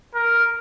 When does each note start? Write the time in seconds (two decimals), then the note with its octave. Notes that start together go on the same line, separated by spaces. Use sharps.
0.14 A#4